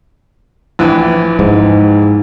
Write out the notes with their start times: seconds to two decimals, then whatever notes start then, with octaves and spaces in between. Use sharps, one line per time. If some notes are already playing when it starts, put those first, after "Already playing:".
0.79 A#1 E3
1.39 G#2